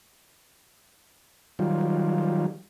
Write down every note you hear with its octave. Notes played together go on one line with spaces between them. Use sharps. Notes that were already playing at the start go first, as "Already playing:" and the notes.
D#3 F#3 G3 F4